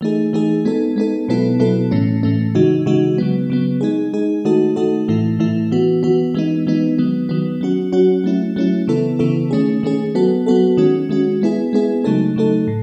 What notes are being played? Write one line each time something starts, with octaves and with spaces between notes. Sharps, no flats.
E3 A3 D#4 G#4
E3 A3 D#4 G#4
G#3 B3 D#4 A4
G#3 B3 D#4 A4
B2 F#3 B3 E4 A4
B2 F#3 B3 E4 A4
A2 E3 A3 C#4
A2 E3 A3 C#4
C#3 E3 G#3 D#4 F#4
C#3 E3 G#3 D#4 F#4
C#3 F#3 B3
C#3 F#3 B3
G#3 D#4 G#4
G#3 D#4 G#4
D#3 A3 D#4 F#4 A4
D#3 A3 D#4 F#4 A4
A2 E3 A3 E4
A2 E3 A3 E4
E3 B3 F#4
E3 B3 F#4
E3 G#3 B3 D#4
E3 G#3 B3 D#4
D#3 F#3 B3
D#3 F#3 B3
F#3 C#4 F#4
F#3 C#4 F#4
F#3 A3 C#4 E4
F#3 A3 C#4 E4
C#3 E3 B3 E4 A4
C#3 E3 B3 E4 A4
D#3 A3 C#4 G#4
D#3 A3 C#4 G#4
F#3 B3 F#4 A4
F#3 B3 F#4 A4
D#3 G#3 C#4 F#4
D#3 G#3 C#4 F#4
G#3 B3 E4 G#4
G#3 B3 E4 G#4
C#3 F#3 A3 D#4 A4
C#3 F#3 A3 D#4 A4
A2